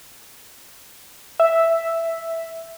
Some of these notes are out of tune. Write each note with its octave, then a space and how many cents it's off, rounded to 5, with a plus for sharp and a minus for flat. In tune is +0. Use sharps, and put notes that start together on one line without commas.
E5 +0